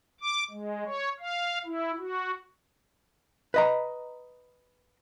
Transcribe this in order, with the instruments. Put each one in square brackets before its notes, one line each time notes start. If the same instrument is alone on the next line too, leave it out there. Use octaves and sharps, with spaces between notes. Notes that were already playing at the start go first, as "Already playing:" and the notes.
[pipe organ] D6
G#3
C#5
F5
E4
F#4
[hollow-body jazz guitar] B4 D#5 A#5